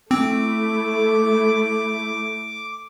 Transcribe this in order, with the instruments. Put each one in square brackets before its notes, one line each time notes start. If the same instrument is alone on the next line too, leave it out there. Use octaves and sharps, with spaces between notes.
[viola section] A3 E4 [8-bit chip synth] C4 [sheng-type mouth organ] D6